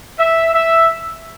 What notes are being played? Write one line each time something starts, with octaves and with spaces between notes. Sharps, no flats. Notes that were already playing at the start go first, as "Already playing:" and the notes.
E5
E5